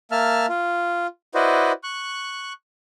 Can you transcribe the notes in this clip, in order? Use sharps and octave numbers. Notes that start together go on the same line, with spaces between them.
A#3 E5 A5 F6
F4
E4 F#4 B4 C5 D5 D#5
C#6 F#6